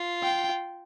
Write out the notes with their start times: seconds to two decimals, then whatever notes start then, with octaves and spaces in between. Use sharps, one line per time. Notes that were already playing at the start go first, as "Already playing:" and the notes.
Already playing: F4
0.23 G5